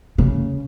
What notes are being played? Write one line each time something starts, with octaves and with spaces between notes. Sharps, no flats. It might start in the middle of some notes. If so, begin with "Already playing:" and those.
C#3